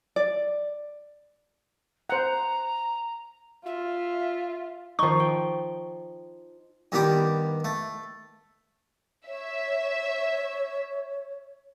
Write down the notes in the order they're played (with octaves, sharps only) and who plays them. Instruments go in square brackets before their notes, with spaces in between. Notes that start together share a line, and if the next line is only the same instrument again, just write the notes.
[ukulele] D5
[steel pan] C5 F#5 [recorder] A#5
[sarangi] F4 [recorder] E5
[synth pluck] D#3 C#6 [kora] F3 D#4
[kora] G5
[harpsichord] G2 D#3 B3 G4 D6
A3
[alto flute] C#5 [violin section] E5